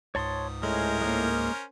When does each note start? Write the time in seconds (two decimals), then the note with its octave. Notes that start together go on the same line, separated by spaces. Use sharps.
0.15 C#2 G#2 C#5 A5 C6 D#6
0.63 A2 G#3 C#4 A#4 C5
1.01 G#3 A#3